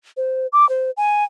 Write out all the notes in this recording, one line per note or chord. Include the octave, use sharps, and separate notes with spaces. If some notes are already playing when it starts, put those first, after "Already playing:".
C5
D6
C5
G#5